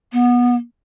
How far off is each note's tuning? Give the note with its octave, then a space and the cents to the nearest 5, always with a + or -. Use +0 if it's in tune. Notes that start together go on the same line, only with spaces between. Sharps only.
B3 -20